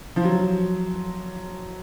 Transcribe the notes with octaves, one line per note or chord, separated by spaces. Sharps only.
F3
F#3